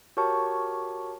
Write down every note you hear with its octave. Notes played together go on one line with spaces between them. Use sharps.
F#4 G4 A#4 C#5 A5 C#6